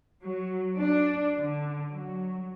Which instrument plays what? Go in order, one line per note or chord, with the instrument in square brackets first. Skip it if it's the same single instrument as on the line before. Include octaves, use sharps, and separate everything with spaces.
[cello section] F#3
D4
D3
F#3